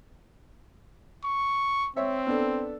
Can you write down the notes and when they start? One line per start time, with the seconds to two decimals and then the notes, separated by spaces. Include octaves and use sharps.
1.24 C#6
1.97 C4 C#5 E5
2.27 B3 D4 A4